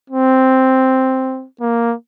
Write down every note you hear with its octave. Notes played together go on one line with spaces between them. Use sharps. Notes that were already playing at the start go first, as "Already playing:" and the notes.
C4
A#3